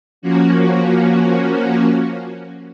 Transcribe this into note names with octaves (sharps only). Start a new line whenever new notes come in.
F3 A#3 C#4 F#4